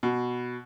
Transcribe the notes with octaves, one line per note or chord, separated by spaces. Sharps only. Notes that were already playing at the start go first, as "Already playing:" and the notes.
B2